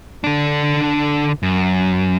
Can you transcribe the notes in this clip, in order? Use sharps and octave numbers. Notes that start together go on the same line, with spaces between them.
D3 D4
F#2